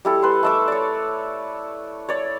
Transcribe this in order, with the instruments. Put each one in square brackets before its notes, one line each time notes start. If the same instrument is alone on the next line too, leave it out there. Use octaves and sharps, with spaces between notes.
[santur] G3 E4 A4
B4 C6
A3 E5 D6
C#5 D5
C#5 D5